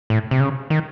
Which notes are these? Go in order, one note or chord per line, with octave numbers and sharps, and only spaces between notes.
A2
C3
C#3
D#3